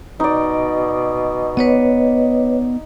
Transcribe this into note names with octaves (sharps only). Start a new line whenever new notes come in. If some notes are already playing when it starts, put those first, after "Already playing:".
B2 D#4 D5
B3 B4 C#5 D#5